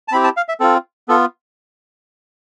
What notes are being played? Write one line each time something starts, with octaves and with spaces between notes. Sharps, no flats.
A5
C4 E4 G4 B5
A5
F5
E5
C4 F4 A4
B3 F4 A4